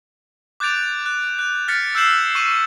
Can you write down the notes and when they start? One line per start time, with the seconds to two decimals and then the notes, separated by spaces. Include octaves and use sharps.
0.60 D6 F#6 G6 A6 D7 F7
1.06 F#6
1.39 F#6 F7
1.68 F6 A6 B6 C#7
1.95 E6 F#6 G6 C7 E7 F#7
2.35 C#6 D#7 F#7